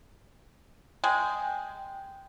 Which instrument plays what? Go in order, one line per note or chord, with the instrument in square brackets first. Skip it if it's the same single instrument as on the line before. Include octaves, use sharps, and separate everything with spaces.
[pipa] G#3 [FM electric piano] G5